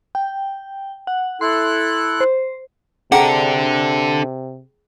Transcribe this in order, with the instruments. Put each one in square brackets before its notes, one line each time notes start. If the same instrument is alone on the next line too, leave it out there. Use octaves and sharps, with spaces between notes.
[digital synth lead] G5
F#5
[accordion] E4 A4 F#6 [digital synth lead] C6
[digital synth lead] C5
[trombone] C3 [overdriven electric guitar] D4 A4 [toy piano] G#4 G5 A#5 [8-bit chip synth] F#5